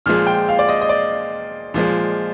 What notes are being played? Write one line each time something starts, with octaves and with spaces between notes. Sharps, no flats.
A#2 F3 G#3 F6
G5
F5
D5
D#5
D#5
D5
A#2 F3 G#3